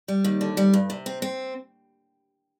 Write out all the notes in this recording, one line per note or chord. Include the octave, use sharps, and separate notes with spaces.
G3
D#2
D3
G3
G2
C3
C4
C4